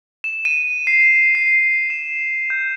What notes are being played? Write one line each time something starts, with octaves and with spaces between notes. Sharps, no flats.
E7
D#7
C7
C7
E7
G6